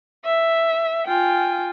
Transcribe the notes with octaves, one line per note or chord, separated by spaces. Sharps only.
E5
F4 G5 G#5